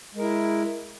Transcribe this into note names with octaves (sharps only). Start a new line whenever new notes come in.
G#3 E4 A#4